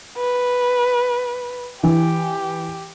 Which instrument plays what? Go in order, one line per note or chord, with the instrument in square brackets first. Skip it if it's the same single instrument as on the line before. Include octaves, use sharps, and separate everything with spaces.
[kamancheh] B4
[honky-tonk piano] E3 [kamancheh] G4